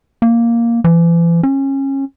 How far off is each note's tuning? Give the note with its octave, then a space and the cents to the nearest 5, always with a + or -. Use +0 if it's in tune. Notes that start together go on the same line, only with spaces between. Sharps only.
A#3 +0
E3 +40
C#4 -25